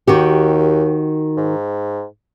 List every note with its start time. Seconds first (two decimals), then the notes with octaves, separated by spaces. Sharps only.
0.08 D#2 D#3 F#4 G4
1.37 G#2